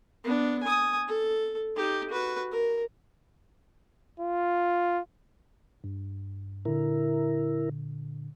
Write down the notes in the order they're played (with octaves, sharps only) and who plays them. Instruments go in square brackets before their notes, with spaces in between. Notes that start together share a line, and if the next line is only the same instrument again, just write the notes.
[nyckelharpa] B3 D4
G#5 D#6
A4
D#4 G4
F#4 B4
A#4
[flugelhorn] F4
[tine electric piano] G2
[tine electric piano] A#2 D3 [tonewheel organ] E4 A#4